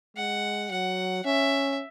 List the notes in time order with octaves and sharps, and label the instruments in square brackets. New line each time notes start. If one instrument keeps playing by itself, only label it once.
[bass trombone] G#3 [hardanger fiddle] F#5
[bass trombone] F#3 [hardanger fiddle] F#5
[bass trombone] C#4 [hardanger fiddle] E5